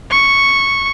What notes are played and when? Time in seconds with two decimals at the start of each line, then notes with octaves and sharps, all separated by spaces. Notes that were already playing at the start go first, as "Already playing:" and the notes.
0.11 C#6